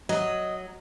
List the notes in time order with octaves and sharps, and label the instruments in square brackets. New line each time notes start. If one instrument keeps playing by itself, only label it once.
[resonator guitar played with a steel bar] F#3 [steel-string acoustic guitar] D#5